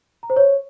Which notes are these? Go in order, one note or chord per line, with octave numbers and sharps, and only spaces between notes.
A#5
C5
C#5